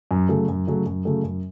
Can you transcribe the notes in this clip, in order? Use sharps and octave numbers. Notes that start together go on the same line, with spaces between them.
F#2
C#3 F#3 A3
F#2
C#3 F#3 A3
F#2
C#3 F#3 A3
F#2